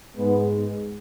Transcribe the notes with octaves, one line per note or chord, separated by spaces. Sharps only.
G#2 G#3 B3